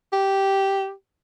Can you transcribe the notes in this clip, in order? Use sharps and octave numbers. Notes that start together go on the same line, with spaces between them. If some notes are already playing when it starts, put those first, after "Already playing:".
G4